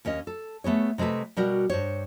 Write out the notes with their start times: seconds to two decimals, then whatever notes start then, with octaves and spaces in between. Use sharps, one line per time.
0.05 D#2 C#4 A#4 D#5
0.27 A4
0.64 A3 B3 G#4 C#5
0.98 C3 G#3 A3 A4 B4
1.37 B2 G3 F#4 A#4
1.70 G2 C5 C#5